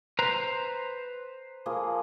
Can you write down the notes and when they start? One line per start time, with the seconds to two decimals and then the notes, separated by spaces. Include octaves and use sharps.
0.19 B4 C5 A#5
1.66 F3 A#3 G#4